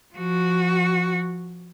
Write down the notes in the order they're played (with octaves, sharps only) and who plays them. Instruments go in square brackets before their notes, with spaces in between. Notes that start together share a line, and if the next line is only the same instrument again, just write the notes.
[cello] F3 F#4